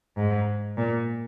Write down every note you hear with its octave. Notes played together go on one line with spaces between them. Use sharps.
G#2
A#2